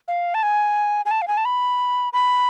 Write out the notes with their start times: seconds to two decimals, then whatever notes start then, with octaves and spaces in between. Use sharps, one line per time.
0.08 F5
0.34 A5
0.43 G#5
1.06 G#5
1.11 A5
1.22 F5
1.28 G#5
1.37 A5
1.45 B5
2.13 B5